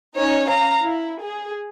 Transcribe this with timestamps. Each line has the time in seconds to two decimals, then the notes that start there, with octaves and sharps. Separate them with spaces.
0.17 C#4 D#4 C#5
0.49 F5 A#5
0.83 E4
1.22 G#4